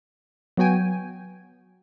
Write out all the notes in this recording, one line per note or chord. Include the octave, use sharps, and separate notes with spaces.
F#3 B3 F#4 G5 G#5